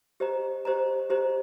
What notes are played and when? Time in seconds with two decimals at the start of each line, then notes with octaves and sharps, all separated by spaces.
0.20 G4 C5 D#5 A#5
0.65 G4 C5 D#5 A#5
1.10 G4 C5 D#5 A#5